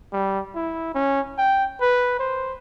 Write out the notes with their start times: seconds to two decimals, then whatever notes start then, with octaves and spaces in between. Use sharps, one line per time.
0.13 G3
0.55 E4
0.95 C#4
1.38 G5
1.81 B4
2.20 C5